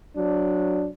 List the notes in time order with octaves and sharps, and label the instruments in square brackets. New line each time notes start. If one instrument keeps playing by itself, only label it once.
[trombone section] F#3 D4